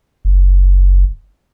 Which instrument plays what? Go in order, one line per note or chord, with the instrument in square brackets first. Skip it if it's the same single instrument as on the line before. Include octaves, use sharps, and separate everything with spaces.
[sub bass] F#1